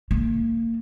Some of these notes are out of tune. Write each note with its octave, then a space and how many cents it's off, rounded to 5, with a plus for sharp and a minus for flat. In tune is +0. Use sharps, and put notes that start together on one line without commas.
A#3 -30